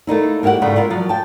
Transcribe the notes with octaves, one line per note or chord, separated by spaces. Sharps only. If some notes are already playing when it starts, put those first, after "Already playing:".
A3 A#3 D#4 E4
A#3 F#4 G4 E5 F#5
G#2 C#3 G3 A3
E4 F4 A#4
F3 F#3
G5 A5